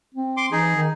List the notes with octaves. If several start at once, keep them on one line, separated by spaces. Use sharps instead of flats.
C4
C6 D6
E3 D#4 G#4
D#3